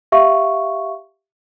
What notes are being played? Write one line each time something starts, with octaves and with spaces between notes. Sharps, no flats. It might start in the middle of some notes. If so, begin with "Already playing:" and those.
G4 E5 F5 C#6